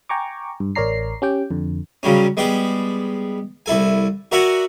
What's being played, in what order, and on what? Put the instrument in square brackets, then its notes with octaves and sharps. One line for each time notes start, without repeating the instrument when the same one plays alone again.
[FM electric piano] G5 G#5 A#5 C#6 D6
G2
A1 A#4 C#5 D5 A#5 C7
C#4 G4 G5
F2 D3
[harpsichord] C#3 F#3 G3 C#4
G3 G#3 B3 D5 G5
C2 E4 A4 G#5
F#4 A#4 D5 E5 F#5 G#5